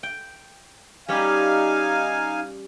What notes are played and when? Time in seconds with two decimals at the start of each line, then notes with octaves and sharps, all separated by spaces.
0.03 G5
1.08 G3 C#4 D#4 G4 F5 G#5